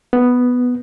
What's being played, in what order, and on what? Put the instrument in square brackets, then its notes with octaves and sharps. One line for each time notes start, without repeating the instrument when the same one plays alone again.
[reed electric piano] B3